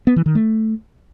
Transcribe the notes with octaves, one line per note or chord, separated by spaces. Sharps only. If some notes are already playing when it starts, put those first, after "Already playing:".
B3
E3
D#3
A3